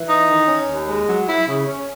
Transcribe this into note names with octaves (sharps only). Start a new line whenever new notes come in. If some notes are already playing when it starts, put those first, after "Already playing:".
Already playing: E3
D#4
D#3
C#4
D#2
G#3
F#3
E4
C#3
C#4